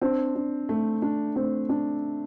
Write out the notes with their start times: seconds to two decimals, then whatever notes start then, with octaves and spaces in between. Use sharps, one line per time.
0.01 C4 D4
0.35 D4
0.69 A3
1.02 D4
1.36 A3 C4
1.69 D4